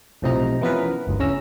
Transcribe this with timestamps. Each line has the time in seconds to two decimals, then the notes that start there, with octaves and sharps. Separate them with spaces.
0.22 B1 A2 C3 F3 D#4 A#5
0.61 E3 F3 B3 C#4 A#4 B4
1.07 G1 D2
1.19 C#3 E3 C#4 A#5 E6